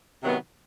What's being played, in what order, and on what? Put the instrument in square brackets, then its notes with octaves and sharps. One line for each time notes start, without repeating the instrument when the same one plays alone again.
[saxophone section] C3 D#3 F#3 B3